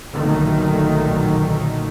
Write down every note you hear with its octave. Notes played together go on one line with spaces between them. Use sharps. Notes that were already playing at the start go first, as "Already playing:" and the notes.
B1 A#2 D3 D#3 A3